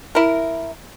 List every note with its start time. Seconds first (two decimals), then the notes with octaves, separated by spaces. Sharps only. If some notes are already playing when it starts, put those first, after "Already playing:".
0.15 E4 A#4